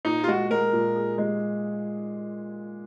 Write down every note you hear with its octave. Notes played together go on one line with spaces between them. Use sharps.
A#2 D#4
F4
G#3 F#4
G#3 A#4
A#2
G#4
G#3